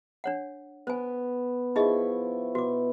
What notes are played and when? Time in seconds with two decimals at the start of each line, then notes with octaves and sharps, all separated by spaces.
0.24 D4 C#5 F#5
0.87 B3 C5 G#5
1.76 F3 D#4 E4 G#4 D#5 C#6
2.55 B2 F#4 D6